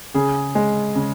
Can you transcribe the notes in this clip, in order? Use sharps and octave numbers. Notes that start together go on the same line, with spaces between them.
C#3 G#4
G#3
C#3